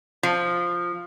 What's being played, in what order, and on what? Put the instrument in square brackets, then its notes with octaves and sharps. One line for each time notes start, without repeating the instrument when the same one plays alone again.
[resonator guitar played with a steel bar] F3